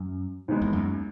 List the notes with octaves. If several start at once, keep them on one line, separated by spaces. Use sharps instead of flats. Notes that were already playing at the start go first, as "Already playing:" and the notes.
Already playing: F#2
D#2 D#3 G#3 B3
E2
F#2